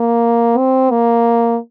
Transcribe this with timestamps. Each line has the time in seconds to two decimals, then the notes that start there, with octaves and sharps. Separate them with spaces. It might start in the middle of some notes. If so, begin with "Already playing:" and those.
Already playing: A#3
0.58 C4
0.91 A#3